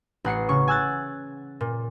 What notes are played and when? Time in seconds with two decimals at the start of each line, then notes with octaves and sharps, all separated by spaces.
0.25 A1 F#5 C7 C#7
0.49 C#3 C#6
0.68 G#5 E6 F#6 A6
1.61 A#2